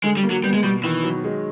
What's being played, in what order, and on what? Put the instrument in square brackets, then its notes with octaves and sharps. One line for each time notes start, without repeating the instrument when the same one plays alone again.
[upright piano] D3 [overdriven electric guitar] G#3
[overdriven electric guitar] G3
[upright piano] A#3
[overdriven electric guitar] F#3
[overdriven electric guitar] G3 [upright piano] B3
[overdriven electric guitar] G#3
[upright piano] B2 [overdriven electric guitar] G3
[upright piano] D#3 [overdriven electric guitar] E3
[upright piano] F#3
G#3